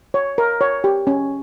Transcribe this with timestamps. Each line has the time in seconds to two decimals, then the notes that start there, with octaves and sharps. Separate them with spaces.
0.14 C#5
0.38 A#4
0.61 C#5
0.84 G4
1.07 C#4